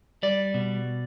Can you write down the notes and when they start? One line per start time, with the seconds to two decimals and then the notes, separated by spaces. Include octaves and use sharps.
0.23 G3 D5
0.54 B2